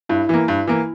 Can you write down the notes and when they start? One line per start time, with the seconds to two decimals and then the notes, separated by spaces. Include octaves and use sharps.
0.09 G2 E4
0.29 E3 A#3
0.48 G2
0.67 E3 A#3